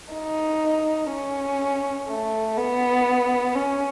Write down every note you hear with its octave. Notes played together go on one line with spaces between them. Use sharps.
D#4
C#4
A3
B3
C#4